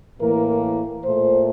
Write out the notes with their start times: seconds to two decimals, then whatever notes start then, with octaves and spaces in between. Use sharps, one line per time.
0.19 A2 E3 A#3 A#4
1.04 A#2 A3 C5